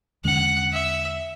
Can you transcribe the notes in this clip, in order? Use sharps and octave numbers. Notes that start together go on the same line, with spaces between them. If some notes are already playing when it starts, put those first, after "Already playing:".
E2 D3 G#3 C#4 F#5
E5